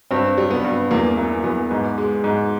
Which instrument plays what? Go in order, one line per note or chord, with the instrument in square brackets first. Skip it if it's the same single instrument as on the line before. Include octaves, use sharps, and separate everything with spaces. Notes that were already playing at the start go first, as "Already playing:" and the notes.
[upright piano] G2 C4
G3
B3
G2
E2 A#3
E3 A#3
E2 B3
G#2
G#3
G#2